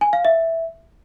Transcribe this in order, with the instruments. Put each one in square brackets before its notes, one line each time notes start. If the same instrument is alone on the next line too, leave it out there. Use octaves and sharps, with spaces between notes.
[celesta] G#5
F5
E5